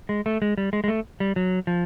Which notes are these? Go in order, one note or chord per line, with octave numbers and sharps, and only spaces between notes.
G#3
A3
G#3
G3
G#3
G#3
A3
G3
F#3
F3